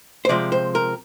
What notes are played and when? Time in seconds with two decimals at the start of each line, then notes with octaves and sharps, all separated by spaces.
0.25 C5
0.29 C3 F3 G#3 C4 D5
0.52 C5
0.75 A#4